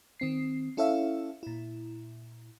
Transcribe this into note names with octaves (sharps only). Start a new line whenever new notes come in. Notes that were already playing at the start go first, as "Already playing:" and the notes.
D#3 C4 C7
C#4 E4 A4 C#5 E5 F5
A#2 E4